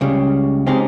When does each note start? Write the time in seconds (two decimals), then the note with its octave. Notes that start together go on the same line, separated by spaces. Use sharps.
0.01 C#2 C#3 G3
0.67 C#3 G#3 C4 D#4 G4